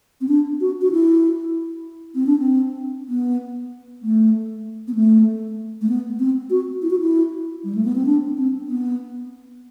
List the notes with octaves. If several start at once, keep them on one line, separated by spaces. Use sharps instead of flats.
C4
D4
F#4
F#4
E4
C4
D4
C4
B3
A3
B3
A3
A3
B3
C4
F#4
E4
F#4
E4
G3
A3
B3
C4
D4
C4
B3